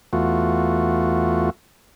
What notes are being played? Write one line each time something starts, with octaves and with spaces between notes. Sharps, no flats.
E2 A3 F4 F#4